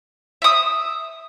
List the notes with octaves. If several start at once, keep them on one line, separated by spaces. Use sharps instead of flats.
E5 D#6